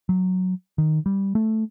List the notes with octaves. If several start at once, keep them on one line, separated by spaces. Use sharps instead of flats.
F#3
D#3
G3
A3